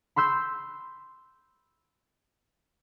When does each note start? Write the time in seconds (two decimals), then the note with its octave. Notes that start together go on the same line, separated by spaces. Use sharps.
0.16 B5 C6 E6 G6